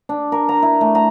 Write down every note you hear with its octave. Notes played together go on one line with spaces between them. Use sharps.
D4
A#4
A#5
E4
A3
A#5